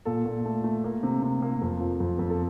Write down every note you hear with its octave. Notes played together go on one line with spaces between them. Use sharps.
A#2 A4
A#2
A3
A3
A#3
C3
C3
A#3
F2
F3
F2
F2
A4